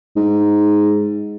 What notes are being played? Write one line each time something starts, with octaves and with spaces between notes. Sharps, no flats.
G#2